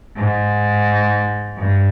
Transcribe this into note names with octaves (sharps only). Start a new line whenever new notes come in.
G#2
G2